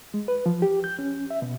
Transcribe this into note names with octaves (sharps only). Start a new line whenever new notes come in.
G#3
B4
F3
G4
G6
C#4
E5
B2